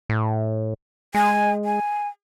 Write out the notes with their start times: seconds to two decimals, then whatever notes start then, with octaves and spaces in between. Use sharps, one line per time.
0.09 A2
1.15 G#3 G#5
1.65 G#5